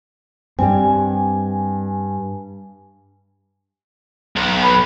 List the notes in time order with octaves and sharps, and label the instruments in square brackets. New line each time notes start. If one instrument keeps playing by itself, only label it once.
[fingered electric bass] G2 [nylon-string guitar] G3 C4 [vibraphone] G#5
[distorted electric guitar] B1
[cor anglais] B4